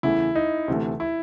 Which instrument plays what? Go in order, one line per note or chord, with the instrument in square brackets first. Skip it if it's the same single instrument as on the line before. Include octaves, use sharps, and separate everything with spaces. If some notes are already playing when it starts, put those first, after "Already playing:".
[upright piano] E2 C#3 E3 A3 [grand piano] E4
[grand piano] D#4
[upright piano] D2 C3 E3 A3
[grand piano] E4